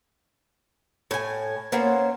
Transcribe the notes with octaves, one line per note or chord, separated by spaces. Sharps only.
A2 G#5
A#3 B3 C#4 C5